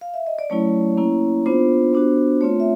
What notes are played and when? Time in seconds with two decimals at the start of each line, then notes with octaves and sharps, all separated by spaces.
0.01 F5
0.14 E5
0.27 D#5
0.39 D5
0.50 F#3 A3 C#4 E4 C#5
0.97 A#3 C#4 E4
1.46 B3 D4 F4 C5
1.93 B3 D4 F#4
2.41 A3 C4 F4 C#5
2.60 E5